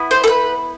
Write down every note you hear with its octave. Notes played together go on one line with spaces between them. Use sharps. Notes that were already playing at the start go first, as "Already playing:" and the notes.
Already playing: B3 E4
C5
A4
B4